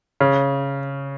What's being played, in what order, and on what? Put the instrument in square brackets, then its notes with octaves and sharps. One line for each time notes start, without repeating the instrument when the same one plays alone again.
[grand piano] C#3